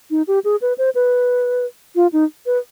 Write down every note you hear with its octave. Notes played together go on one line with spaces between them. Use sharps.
D#4
G4
G#4
B4
C5
B4
F4
D#4
B4